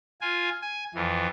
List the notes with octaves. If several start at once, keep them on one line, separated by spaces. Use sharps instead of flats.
F4 G#5
G#5
F2 E3